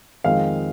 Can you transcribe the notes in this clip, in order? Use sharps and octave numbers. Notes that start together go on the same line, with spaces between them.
F2 D#3 G#3 F5